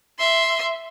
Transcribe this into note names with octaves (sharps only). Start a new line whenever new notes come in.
E5 C6